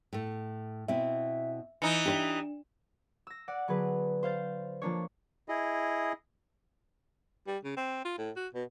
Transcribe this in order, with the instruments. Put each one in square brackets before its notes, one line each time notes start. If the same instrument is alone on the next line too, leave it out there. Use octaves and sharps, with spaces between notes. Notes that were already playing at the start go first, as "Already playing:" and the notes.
[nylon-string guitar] A2 A3
[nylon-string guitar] B2 C4 E4 [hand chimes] E5
[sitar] E3 D#4 [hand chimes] C#7
[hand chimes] D4 [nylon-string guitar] G4 B4 E5
[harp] E6 A#6
D5 F#5
D3 F#3 B3 G#4 B4
C5 F5 G6 A6
F3 A#3 D4 C#5
[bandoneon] E4 G#4 D#5
[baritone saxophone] G3
C#3
C4
F4
A2
F#4
B2